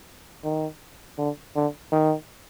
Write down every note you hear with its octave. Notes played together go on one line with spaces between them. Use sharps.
D#3
D3
D3
D#3